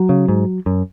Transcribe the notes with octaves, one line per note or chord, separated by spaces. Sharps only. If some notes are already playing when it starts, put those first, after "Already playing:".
Already playing: F#3
C#3
G#2
F#2